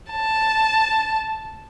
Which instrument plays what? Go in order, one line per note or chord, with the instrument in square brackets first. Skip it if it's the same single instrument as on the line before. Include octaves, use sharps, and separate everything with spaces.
[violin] A5